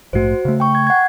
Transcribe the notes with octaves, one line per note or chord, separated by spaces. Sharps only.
A#1 G#2 A3 F#4 C5
C#3 A3
G5 C#6
G#6
F#5 G#6